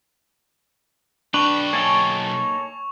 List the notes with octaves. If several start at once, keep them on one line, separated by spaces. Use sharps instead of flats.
B1 D4 B4 G5 C#6 F7
A#3 D#4 A4 C#5 G#5 A5